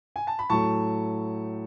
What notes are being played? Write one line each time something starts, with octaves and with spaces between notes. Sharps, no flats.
G#5
A5
B5
A2 F#3 A3 A5 C#6